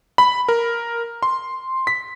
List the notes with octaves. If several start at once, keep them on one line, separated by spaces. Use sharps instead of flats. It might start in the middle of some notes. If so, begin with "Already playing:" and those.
B5
A#4
C6
B6